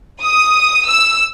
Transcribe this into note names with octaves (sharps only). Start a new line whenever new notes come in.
D#6
E6